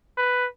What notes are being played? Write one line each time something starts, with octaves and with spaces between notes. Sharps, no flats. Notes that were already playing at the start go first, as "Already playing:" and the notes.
B4